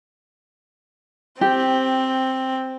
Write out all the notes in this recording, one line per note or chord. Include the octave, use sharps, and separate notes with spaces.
C4 G4